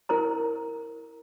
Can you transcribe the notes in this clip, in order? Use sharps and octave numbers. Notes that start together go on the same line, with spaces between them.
E4 A#4 C5 A#5